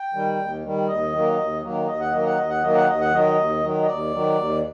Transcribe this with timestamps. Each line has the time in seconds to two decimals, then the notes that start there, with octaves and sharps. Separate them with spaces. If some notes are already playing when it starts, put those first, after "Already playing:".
Already playing: G5
0.13 D#3 G3
0.38 D#2
0.62 D#3 G3
0.88 D#2 D#5
1.12 D#3 F#3 A#3
1.37 D#2
1.63 D#3 F#3 A#3
1.87 D#2 D#5
2.00 F#5
2.12 D#3 F#3 A#3 D#5
2.26 F#5
2.37 D#2 D#5
2.50 F#5
2.62 D#3 F#3 A#3 D#5
2.75 F#5
2.87 D#2 D#5
3.01 F#5
3.11 D#3 F#3 D#5
3.36 D#2
3.61 D#3 F#3
3.82 D#5
3.86 D#2 D5
4.11 D#3 F#3
4.36 D#2